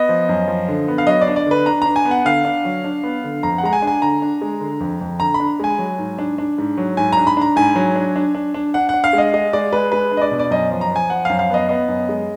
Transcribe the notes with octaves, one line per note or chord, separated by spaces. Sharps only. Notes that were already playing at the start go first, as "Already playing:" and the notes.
Already playing: B3 D#5
F3
F#2
F3
D3
B3
F5
F#3 D#5
D5
D4
D5
D3 B4
D4 A#5
D4 A#5
G#5
B3
F#5
D3 F5
D4
F#3
D4
B3
D3
F2 A#5
F#5
G#3 A#5
G#5
D4
G#5
D3 A#5
D4
G#3
D3
F2
F2
D3 A#5
B5
D4
G#3 G#5
F#3
G#2
D4
D4
G#2
F#3
G#2 G#5
D4 A#5
B5
D4 A#5
G#2 G#5
F#3
D4
D4
D4
D4
D4 F#5
D4 F#5
F5
G#3 D#5
G#3 D#5
G#3 D5
G#3 B4
G#3 B4
D4
D#5
D5
B2
D5
F#2 D#5
F3
A#5
F3 G#5
F3 F#5
F#2 F5
F5
B3 D#5
B3 D#5
F#2
G#3